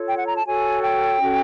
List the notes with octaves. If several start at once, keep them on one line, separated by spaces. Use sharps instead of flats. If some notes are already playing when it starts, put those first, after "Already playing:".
Already playing: F4 A4 C#5
G5
F#5
A#5
A5
F#4 A4 C#5 G#5
G5
C#4 F#4 A4